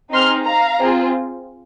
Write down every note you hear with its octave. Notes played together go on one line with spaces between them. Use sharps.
C4 D#4 G#4 C6 F6
F5 A#5
C4 F4 G#4